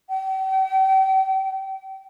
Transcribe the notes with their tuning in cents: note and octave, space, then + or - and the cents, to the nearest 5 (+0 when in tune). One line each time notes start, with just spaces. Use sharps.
G5 -40